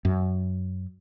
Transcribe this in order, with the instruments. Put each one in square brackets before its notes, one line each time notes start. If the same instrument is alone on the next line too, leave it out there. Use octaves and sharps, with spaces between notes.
[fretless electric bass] F#2